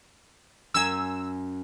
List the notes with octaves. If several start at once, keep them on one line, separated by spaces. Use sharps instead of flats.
F#2 G#5 E6